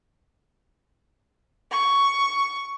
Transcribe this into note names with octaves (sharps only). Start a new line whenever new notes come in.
C#6